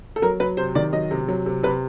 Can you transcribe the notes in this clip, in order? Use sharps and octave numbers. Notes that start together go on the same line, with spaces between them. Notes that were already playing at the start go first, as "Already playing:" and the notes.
A4
F#3 A#4
F#3 B4
C3 C5
D#3 D5
F#3 D#5
C3
F#3
C3
C3 B4